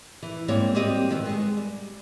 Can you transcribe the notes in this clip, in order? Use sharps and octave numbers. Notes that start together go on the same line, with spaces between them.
E3
G#2 G3 A#3 C4 C#5
G3 A#3 C4 F#4 G4 D#5
F#2 D#3 B3 C4
G#3 B3
G3